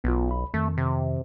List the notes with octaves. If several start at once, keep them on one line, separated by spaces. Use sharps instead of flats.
B1 B3 F4
B5
F2 D#3 A3
C3